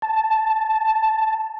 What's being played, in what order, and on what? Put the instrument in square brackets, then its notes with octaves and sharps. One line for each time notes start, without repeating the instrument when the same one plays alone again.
[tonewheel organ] A5